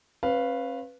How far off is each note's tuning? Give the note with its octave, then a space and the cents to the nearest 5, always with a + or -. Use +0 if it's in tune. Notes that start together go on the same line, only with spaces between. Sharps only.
C#4 -45 B4 +0 F5 +0